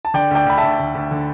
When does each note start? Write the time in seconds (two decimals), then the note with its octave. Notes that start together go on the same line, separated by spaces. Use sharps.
0.05 A5
0.14 D3 D5 G5
0.31 D2 D5 G5
0.46 D2 B5
0.58 E5 A5
0.63 D2
0.79 D2
0.95 D2
1.11 D3